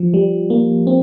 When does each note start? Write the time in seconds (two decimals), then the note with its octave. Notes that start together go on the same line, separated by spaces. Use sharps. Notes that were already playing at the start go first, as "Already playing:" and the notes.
Already playing: F3
0.14 G3
0.50 A#3
0.87 C4